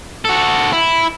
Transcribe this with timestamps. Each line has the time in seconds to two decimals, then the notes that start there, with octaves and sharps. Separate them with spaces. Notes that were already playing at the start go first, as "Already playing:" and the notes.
0.25 F#4 A4
0.72 E4